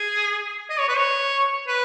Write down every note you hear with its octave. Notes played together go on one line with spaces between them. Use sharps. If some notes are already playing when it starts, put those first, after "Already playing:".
Already playing: G#4
D#5
C#5
B4
C#5
B4